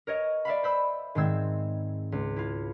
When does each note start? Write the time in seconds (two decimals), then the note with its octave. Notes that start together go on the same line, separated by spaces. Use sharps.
0.07 A#4 C#5 D#5
0.45 D5 E5 F5 B5
0.63 C5 B5 E6
1.15 G#2 D#3 G#3 C4 E6 G#6
2.12 C#2
2.36 E4 F4